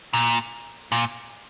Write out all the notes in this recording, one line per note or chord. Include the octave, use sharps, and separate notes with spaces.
A#2
A#2